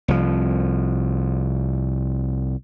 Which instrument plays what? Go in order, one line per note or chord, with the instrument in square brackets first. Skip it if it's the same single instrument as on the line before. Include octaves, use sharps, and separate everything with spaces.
[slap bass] C2 F3